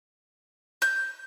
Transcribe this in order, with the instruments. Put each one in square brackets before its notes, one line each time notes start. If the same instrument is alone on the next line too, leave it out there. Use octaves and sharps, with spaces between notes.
[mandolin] G6